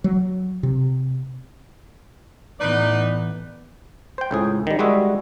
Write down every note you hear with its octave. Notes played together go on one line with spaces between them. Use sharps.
F#3
C3
A2 E3 B3 D#4 B4 D5
C5 G5
C#2 A2 G#4
D#3 G3
G3 G#3 F#4 G#4 E5